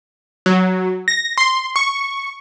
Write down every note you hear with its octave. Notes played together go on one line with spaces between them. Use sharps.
F#3
A#6
C6
C#6